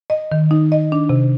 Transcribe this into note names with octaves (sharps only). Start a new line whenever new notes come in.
D#5
D#3
D#4
D#5
D4
C3